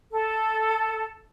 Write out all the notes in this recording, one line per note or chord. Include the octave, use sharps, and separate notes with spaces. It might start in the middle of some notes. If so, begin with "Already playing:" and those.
A4